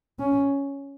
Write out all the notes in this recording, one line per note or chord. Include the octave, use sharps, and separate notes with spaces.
C#4